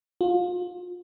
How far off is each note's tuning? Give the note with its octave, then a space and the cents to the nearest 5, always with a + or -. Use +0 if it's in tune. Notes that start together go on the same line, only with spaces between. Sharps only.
F4 +30